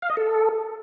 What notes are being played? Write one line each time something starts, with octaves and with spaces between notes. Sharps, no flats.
F5
D#5
A4